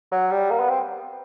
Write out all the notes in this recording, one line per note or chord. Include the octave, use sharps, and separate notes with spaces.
F#3
G3
A#3
B3
C4